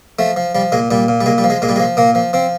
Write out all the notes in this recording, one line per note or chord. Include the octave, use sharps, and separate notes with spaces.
F3 A3
F3
F3 G3
A#2 G#3
A#2 G3
A#2
G3
A#2 G#3
G3
F3
G#3
A#2 G#3
G3
G#3
F3
A#2 A#3
F3
F3 C4